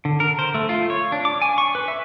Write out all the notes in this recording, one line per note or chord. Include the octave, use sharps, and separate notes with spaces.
D3
A#4
C5
A3
F4
C#5
D4
D6
G#5
C#6
B4
E5